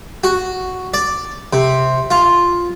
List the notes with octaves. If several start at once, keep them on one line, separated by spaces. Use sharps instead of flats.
F#4
D5
C3
F4